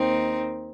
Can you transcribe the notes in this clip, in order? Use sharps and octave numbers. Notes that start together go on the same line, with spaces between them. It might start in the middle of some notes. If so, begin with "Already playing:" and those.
Already playing: D#2 D#3 C4 D#4